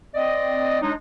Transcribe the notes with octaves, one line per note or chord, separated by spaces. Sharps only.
C4 D5 D#5
F#3 G#3 D4 D#4